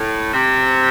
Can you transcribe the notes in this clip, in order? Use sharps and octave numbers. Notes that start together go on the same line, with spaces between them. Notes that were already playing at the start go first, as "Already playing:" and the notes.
Already playing: A2
C3